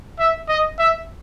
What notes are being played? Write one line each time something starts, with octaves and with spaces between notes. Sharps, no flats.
E5
D#5
E5